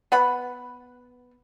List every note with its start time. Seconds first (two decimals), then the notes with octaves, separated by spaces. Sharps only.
0.12 B3 F#5 B5